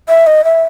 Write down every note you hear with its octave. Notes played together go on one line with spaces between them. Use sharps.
E5
D#5
E5